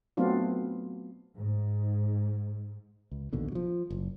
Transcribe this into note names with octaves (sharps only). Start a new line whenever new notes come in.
F#3 A3 B3 C4 D4 F4
G#2
C#2
A#1 D#2 B2 D3
F3 F#3
F#1